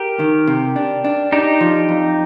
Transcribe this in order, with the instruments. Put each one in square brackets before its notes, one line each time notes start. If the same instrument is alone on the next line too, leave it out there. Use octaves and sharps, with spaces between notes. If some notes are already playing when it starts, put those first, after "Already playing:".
Already playing: [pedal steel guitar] G4 A#4
[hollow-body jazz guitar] D#3
C3
D4
D4
[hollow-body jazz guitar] D4 [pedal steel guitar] D#4 G4
[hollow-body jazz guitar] F3
F2